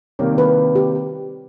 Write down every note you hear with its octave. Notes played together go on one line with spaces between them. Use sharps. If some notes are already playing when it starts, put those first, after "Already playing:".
C3 D#3 G3 A#3 C#5
B4
G4